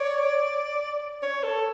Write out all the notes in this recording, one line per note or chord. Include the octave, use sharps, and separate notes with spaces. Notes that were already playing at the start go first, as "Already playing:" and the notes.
Already playing: C#5 D5
C#5
A4